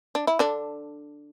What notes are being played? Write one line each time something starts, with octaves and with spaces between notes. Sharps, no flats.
D4
E4
D3 D4